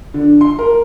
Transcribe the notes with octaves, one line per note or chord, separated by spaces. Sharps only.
D3
C6
A#4